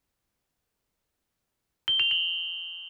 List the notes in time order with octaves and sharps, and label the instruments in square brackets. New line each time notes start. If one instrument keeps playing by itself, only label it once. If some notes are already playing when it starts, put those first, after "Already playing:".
[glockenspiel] G7
F7
F#7